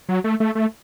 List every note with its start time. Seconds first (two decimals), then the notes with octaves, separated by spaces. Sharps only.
0.09 F#3
0.24 A3
0.40 A3
0.55 A3